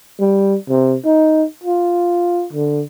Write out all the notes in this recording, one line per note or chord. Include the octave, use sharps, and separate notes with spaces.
G3
C3
D#4
F4
D3